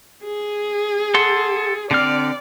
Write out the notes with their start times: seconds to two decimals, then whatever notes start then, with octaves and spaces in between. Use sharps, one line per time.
0.24 G#4
1.14 A4 F#5 C6
1.91 D3 C4 D5 F6